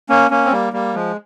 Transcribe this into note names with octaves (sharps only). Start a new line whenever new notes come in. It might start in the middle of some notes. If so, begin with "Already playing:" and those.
A#3 C#4
A#3 C#4
C4
G3 A#3
G3 A#3
F3 G#3